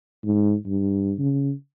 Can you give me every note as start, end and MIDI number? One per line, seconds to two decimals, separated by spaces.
0.24 0.54 44
0.66 1.14 43
1.18 1.52 49